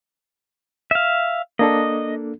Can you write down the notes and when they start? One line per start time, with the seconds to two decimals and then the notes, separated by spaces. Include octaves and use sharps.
0.91 E5 F5
1.59 A#3 D4 A4 D#5